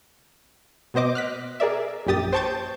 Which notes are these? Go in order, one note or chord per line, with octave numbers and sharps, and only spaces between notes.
B2 B3 C5 D#5 D6
F6 F#6 B6
G#4 A#4 D5 E5
A#1 F#2 G4 D#6 A6
C5 G5 A5 C#6 G6 A6